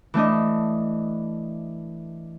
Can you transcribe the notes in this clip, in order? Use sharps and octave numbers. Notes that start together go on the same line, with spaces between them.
E3 A3 D4 D#5